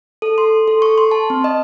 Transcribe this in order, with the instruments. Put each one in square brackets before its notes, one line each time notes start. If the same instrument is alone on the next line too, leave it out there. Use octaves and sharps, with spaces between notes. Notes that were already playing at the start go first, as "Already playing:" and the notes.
[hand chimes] A4
C6
A4
C#6
C6
A5
C4
D#5